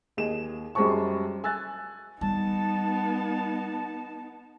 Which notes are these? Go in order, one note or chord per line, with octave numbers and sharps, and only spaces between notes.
D#2 G#4 D#5 E7
F#2 G3 G#3 C5 A5 C#6
G#5 E6 F#6 A6
G3 B3 D#4 A5